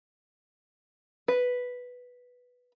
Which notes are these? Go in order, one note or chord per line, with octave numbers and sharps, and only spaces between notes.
B4